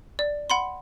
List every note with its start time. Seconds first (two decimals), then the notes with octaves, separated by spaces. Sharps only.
0.19 D5
0.50 F#5 B5 C6